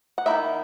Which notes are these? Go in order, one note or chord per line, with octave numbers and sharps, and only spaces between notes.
F#5
D#3 A#3 D#4 E4 E5